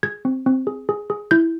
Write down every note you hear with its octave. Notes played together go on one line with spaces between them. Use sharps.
G#4 G#6
C4
C4
G#4
G#4
G#4
E4 G6